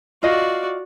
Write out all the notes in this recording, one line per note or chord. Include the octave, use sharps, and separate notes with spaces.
F4 F#4 D5 D#5 F5